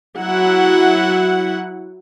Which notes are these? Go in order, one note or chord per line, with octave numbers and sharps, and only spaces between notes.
F#3 E4 F#5